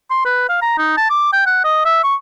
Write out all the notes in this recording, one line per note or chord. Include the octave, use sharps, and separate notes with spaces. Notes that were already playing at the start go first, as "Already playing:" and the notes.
C6
B4
F5
A#5
D#4
A5
D6
G5
F#5
D#5
E5
C#6